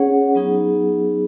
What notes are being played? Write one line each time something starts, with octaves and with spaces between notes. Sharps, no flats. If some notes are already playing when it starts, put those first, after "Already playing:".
Already playing: C#4 G#4 C#5 F#5
F#3 B3 D#4 G#4